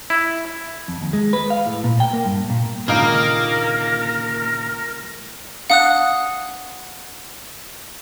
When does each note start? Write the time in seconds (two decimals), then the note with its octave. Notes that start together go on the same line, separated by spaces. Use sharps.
0.10 E4
0.88 F2
1.01 D#2
1.13 G#3
1.33 B4
1.50 F5
1.66 A2
1.84 A#2
2.00 G5
2.13 A#3
2.25 G2
2.50 A#2
2.88 C#2 A#2 D3 D#3 A#3 D#4 A#4 F5
5.70 D4 F5 F#5 D#6 F#6